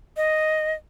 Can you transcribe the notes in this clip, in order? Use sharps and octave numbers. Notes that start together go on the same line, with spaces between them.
D#5